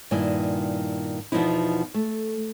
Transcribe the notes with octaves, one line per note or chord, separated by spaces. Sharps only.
G2 A#2 D#3 E4 G#5
E2 B2 F3 B3 D#4 E4
A3